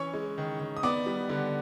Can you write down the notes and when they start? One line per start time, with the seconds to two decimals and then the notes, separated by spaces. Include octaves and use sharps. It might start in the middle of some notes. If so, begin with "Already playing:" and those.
Already playing: E3 C#4 C#5 C#6
0.13 G#3
0.38 D#3
0.60 D#3
0.77 D#6
0.83 B3 D5 D6
1.06 G3
1.29 D3